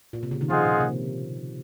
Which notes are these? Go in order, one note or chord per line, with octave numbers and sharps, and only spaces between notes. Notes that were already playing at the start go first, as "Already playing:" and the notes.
A#2
C3
C#3
D#3
F3 F4 G#4 C5 D#5 F#5
A#2
C3